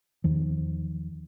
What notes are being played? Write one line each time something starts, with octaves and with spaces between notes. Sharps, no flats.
E2 D#3 F3